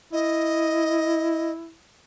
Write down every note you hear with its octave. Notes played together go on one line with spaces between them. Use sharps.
E4 D#5